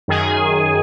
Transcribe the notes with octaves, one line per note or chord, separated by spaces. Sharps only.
F#2 D#3 G#4 G#5